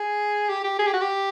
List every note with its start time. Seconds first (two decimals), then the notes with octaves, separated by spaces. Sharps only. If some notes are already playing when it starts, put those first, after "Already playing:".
Already playing: G#4
0.49 G4
0.64 G4
0.79 G#4
0.87 G4
0.94 F#4
1.01 G4